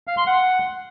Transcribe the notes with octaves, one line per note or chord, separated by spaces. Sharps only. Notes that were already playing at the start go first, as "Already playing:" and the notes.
F5
C6
F#5